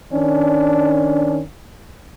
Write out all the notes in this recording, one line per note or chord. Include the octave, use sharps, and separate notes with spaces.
D#3 C#4 D4